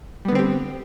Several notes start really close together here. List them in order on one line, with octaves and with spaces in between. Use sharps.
G3 B3 D3 C4 G4